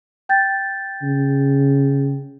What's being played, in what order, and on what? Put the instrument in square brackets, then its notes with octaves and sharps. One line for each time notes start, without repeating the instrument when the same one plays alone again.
[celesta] G5 G6 A6
[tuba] C#3